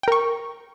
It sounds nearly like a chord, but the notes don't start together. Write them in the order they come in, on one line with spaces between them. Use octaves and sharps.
G5 A#4 C#6